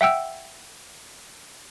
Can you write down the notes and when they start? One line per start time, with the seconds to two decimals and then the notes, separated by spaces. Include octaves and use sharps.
0.01 E5 F#5 G5 E6